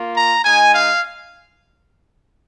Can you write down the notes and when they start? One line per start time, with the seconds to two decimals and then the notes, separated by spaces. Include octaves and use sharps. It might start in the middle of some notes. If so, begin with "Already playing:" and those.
Already playing: A#3 F4
0.17 A#5
0.45 G#3 D#4 G#5
0.73 F5